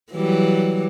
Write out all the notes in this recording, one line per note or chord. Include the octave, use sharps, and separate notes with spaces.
E3 F#3 G3